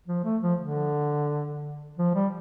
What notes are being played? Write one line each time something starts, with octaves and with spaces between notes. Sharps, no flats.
F3
A3
F3
D3
F3
G3